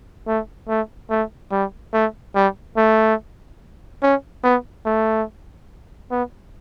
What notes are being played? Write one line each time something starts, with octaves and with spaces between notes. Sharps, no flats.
A3
A3
A3
G3
A3
G3
A3
C#4
B3
A3
B3